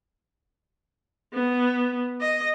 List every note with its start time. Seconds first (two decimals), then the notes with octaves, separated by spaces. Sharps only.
1.34 B3
2.21 D#5